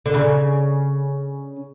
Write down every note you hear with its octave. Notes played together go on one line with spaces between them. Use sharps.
D3
C#3